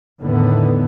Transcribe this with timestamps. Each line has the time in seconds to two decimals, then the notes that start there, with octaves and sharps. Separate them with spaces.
0.22 E2 A2 D3 D#3 B3